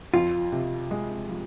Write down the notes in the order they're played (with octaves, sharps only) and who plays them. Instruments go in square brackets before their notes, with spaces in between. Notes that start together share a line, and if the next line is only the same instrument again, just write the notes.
[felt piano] F2 [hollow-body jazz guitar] F4
[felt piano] C3
G#3
F3